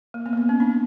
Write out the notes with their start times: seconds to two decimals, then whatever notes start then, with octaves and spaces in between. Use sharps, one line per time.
0.14 A#3
0.26 B3
0.33 A#3
0.37 B3
0.49 C#4
0.60 C4 D4